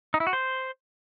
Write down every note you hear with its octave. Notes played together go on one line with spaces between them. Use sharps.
D#4
E4
F#4
C5